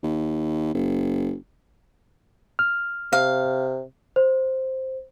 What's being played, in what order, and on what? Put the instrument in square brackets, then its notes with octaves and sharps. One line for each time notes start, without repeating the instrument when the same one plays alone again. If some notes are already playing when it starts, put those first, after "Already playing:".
[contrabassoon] D#2
F#1
[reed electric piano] F6
[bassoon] C3 [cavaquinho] F5
[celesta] C5